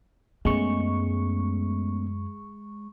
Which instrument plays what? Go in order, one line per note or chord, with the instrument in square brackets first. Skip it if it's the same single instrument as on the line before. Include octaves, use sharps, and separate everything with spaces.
[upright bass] F#2 [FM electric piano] G#3 C#6 [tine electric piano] A3 B3 C#4